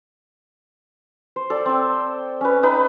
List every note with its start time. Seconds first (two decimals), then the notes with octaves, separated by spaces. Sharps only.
1.36 C5
1.50 A4 D5 G5
1.66 C4 G5
2.41 C#4 B4
2.63 D#4 B4 G5 B5